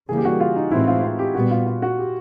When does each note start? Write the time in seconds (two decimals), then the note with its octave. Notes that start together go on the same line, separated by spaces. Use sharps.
0.08 C#3 E3 G3 A#3 G#4
0.18 G4
0.25 F#4
0.40 F4
0.56 D#4
0.71 A2 E3 G#3 C4 E4
0.87 F4
1.03 F4
1.19 G4
1.35 A#2 G3 B3 F#4
1.51 F4
1.66 F4
1.82 F#4
1.98 G4